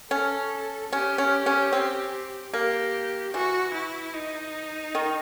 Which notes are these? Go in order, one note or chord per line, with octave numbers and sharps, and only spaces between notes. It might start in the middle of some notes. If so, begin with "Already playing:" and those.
C#4 A4
C#4 G4
C#4
C#4
C4
A#3 G4
E3 F#4
E4
D#4
D#3